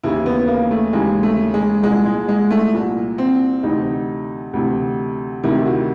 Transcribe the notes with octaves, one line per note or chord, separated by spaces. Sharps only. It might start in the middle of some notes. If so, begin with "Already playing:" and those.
D#2 C#3 E3 E4
B3
A#3
A3
D#2 C#3 E3 G#3
A3
G#3
C2 A#2 G#3
G#3
G#3
A3
C2 A#2
C4
D2 C3 E3 D#4
D2 C3 E3
D2 C3 D#3 E4
F#4